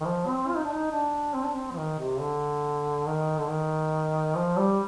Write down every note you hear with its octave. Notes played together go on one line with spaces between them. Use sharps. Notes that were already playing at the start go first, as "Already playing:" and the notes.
D#3
F3
C4
F4
D#4
D4
D#4
D4
C4
D4
C4
F3
D#3
C3
D3
D#3
D3
D#3
F3
G3